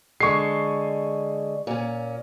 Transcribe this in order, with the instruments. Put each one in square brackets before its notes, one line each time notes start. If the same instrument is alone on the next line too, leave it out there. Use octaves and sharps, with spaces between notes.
[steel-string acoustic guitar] D3 G#3 [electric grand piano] C#6 C7
[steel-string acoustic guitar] A#2 C#4